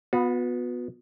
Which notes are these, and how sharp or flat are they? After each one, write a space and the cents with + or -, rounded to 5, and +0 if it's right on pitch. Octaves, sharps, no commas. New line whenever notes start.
B3 +0 F#4 -45